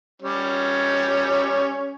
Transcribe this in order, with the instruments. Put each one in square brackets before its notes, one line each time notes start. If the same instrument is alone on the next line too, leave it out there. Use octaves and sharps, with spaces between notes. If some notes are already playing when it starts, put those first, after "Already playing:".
[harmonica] G3 C#4 C#5